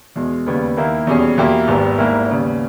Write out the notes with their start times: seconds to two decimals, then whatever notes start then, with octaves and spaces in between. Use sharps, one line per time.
0.16 E2 B2 G#3
0.46 D#2 C#3 G3 B3
0.77 D#2 D#3 A#3 E4
1.07 E2 B2 G3 C#4 G#4
1.38 E2 B2 A#3 E4 G4
1.68 G#1 G#2 G3 B3 G4
1.98 G#2 G3 A#3 E4 A#4
2.28 D#2 C#3 G3 B3